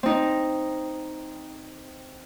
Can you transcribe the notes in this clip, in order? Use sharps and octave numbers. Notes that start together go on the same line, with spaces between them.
C4 D#4